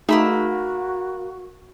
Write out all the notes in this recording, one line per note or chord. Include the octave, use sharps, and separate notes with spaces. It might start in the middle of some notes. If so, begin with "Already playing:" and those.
A3 A#3 D#4 F#4 G#4 B5 E6